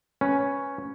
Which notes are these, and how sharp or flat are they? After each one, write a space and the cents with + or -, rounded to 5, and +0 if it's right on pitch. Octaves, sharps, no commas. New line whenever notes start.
C#4 +0 B4 +0